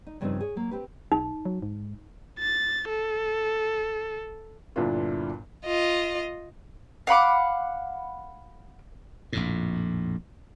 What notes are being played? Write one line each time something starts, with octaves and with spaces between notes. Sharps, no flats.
D#4
G2 C#3 F3 A#3 C4 D#4
G#4 C#5
F#3 A#3
C4 G4 B4
B1 D#4
F#3
G#2
A6
A4
G1 G2 A#2 D4 E4 F4
F4 D#5
F5 F#5 B5 D6
A#1 F2 A2